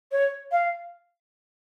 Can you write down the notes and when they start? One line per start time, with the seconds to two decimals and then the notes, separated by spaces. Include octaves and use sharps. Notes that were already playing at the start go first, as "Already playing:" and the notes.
0.12 C#5
0.52 F5